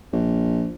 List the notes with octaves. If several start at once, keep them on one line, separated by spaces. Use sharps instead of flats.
A#1